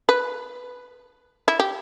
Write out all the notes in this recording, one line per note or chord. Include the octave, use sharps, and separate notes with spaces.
B4
E4
G4